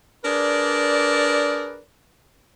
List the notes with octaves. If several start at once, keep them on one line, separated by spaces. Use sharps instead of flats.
D4 G#4 A#4 B4 D5